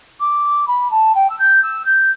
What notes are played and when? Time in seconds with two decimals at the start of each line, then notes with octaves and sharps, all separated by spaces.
0.20 D6
0.68 B5
0.91 A5
1.15 G5
1.30 E6
1.39 G6
1.63 E6
1.85 G6